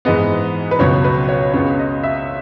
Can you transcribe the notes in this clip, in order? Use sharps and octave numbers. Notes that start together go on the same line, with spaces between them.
G#2 E3 G#3 B3 D#5
B4
C#2 B2 F#3 B3 C#5
B4
C#5
C#2 C#3 G#3 B3 C#5
D#5
E5